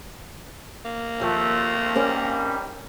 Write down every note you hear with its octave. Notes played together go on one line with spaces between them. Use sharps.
A#3
D#2 F3 A3 C4
D#3 E3 G3 C4 C#4 A#4